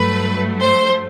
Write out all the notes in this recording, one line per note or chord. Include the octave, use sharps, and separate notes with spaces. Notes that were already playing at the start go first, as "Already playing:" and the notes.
Already playing: G2 F#3 A3 B4
C5